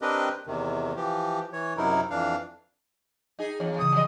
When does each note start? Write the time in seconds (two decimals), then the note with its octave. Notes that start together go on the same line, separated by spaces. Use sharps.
0.02 C4 D4 G4 A#4 B4 D#5
0.47 E2 C3 D#3
0.96 E3 F3 G4
1.53 E3 C#5
1.77 F#2 C3 F#3 D#4 E4 A#4
2.10 F2 E3 D4 F5
3.39 D#4 G#4
3.60 E2 C#5
3.79 C#3 E3 D#6
3.92 F3 G3 D#5